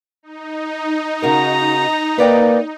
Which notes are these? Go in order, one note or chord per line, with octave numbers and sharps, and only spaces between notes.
D#4
C#3 F#4 A#4 A#5
A#3 B4 D5 G5